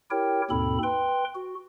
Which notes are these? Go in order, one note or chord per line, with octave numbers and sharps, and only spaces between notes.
E4 G4 A#4 C#5 G5
D#2 G#2 B2 C4 A4 B5
B4 G5 C6
F#4